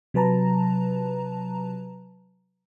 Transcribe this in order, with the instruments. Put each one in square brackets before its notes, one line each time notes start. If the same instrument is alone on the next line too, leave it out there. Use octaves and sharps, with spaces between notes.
[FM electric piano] C3 F#3 B4 A5 A#5